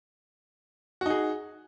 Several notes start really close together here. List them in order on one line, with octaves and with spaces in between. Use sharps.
F#4 D#4 G#4